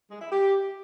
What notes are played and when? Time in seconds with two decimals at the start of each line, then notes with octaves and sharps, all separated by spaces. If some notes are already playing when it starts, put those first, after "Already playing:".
0.11 G#3
0.21 E4
0.32 G4